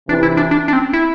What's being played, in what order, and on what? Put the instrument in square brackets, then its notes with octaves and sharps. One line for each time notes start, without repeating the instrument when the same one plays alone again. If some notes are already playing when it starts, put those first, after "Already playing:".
[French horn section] C3 E3 [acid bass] D4
[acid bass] E4
D4
D4
D4
C4
E4